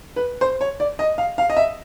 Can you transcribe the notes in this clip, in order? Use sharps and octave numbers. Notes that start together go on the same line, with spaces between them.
B4
C5
C#5
D5
D#5
F5
F5
D#5
E5